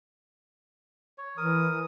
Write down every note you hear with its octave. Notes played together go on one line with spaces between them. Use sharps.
C#5
E3 A#4 D#6